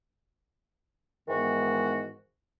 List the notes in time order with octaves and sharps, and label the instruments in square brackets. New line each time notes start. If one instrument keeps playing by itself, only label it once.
[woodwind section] G#2 D#3 E3 G#3 B3 F#4